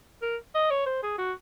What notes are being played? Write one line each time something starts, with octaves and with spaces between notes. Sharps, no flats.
A#4
D#5
C#5
C5
G#4
F#4